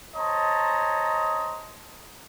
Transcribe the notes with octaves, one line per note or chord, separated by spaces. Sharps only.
C5 C#5 D#5 A5 A#5